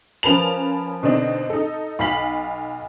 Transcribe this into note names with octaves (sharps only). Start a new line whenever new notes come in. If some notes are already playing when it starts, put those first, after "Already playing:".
F3 C#4 A#4 B4 A5 F7
B2 D3 C4 D4 D#4
D#4 A4
B1 F5 B5 B6 F#7